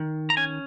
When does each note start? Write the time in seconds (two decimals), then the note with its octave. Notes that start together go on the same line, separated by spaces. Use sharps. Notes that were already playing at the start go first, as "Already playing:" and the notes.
Already playing: D#3
0.30 A#5
0.37 C#4 G#5